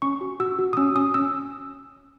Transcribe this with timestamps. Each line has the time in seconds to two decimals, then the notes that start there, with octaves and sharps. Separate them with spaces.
0.02 C#4 C#6
0.21 F#4
0.40 F#4 E6
0.59 F#4
0.73 D#6
0.77 C#4 E6
0.96 C#4 D#6
1.14 C#4 E6